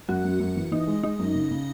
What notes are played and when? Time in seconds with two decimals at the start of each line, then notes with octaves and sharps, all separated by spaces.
0.08 F#2 F#4
0.25 F#2
0.40 F#2
0.56 E3
0.72 E3 D#4
0.88 G#3
1.03 G#3 D#4
1.19 F#2
1.35 C#3
1.51 C#3